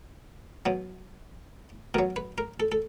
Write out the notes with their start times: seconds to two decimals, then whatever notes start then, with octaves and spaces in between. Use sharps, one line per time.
0.66 B2 F#3
1.94 B2 F#3 A#4
2.16 B4
2.38 A#4
2.60 A4
2.72 A4